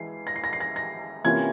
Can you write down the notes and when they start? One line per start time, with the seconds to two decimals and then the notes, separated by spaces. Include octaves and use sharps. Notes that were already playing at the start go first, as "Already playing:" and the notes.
Already playing: E3 G#3 C7
0.27 A#6
0.36 C7
0.44 A#6
0.53 C7
0.60 A#6
0.76 A#6
1.24 C3 E3 A#3 C#4 F4 G#6